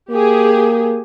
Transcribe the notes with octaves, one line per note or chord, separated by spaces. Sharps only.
A#3 G4 G#4